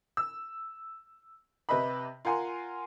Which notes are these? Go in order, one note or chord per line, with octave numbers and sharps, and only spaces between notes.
E6
C3 G4 B4 D#5 E5 B5
F4 A#4 F#5 G#5 A#5 C6